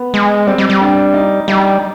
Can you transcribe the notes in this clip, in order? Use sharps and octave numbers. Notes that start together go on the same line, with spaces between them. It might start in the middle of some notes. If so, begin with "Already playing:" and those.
Already playing: B3
G#3
G3 C4
G3
G3
D4
D#4
G3 D#4